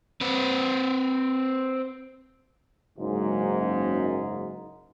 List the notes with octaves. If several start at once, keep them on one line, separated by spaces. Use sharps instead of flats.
C4 B4
F#1 G#2